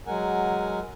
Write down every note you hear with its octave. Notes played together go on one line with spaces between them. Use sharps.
F#3 G#3 A#4 F#5 G#5